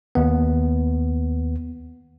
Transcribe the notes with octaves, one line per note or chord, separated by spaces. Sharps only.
D#2 B3